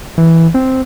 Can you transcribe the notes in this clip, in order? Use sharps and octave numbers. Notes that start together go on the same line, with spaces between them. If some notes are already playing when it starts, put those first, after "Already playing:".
E3
C4